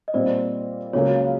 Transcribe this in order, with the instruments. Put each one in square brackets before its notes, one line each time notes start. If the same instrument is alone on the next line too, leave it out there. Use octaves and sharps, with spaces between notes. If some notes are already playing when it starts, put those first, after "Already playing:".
[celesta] D#5
[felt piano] A#2 G3 C4 [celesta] C5 D5
[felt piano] C#2 C#3 F#3 A#3 C#4 [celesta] C#5